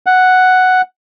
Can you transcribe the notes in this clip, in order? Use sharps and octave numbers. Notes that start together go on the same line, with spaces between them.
F#5